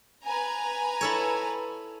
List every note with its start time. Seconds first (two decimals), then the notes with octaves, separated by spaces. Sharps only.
0.24 B4 G#5 A#5
1.01 E4 A4 C#5